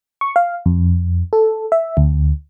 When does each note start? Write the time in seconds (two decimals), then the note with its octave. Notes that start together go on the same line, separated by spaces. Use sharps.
0.21 C#6
0.36 F5
0.66 F2
1.33 A4
1.72 E5
1.97 D2